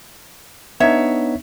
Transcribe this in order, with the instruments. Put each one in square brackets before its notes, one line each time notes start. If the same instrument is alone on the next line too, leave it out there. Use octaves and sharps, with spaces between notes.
[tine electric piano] B3 D4 D#4 [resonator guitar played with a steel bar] C#5 E5